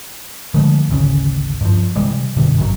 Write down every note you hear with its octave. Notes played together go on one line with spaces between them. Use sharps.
D3 F3 G#3 A3
G#1 D2 C#3
G2 F3
C3 E3 G3 G#3
F#2 B2 D3 G3
G#1 F#2 A#2 F#3